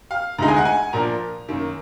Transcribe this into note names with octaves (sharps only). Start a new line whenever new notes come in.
F5
D2 D3 G#3 D#4 A#5
G#5
F#5
G#5
A#2 F3 A#3 D4 A#5
F#2 D#3 A#3